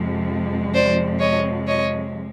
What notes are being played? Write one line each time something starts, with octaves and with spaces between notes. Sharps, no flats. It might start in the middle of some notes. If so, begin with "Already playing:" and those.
Already playing: F2 C3 F3 G#3
C5 D5
C#5 D#5
C#5 D#5